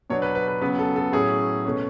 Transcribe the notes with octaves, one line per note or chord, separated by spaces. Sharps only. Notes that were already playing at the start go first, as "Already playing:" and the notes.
B2 F#3 B3 D4 C#5
B4
B4
B4
C#3 F#3 B3 B4
A4
A4
A2 F#3 C#4 G#4
B2 A3 C#4